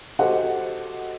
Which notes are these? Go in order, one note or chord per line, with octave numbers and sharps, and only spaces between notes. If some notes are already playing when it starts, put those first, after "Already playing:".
F#4 G4 A4 C5 D#5 F#5